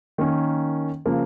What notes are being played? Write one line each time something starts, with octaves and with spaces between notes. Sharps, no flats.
D#3 A#3 C#4
C#3 F3 A#3